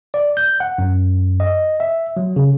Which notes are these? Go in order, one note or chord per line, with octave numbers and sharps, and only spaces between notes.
D5
G6
F#5
F#2
D#5
E5
F#3
C#3